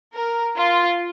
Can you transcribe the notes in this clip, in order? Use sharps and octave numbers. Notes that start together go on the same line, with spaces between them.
A#4
F4